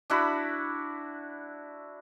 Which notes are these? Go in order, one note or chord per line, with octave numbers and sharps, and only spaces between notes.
D4 E4 F#4 B5